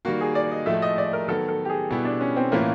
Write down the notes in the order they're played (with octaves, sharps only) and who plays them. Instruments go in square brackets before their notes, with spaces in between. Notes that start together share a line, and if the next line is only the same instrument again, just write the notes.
[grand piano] D#3 G3 A#3 [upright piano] F#4
[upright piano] G#4
D5
D#5
[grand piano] A2 F3 A3 [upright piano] E5
[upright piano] D#5
D5
A#4
[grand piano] D#3 F#3 B3 [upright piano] A4
[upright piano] A4
G4
G#4
[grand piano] B2 G3 B3 E4
[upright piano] D4
C#4
C4
[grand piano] A2 E3 A3 C#4 F4 [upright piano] A#3